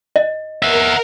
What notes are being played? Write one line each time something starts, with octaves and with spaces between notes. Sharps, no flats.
D#5
A#4 E5 F#5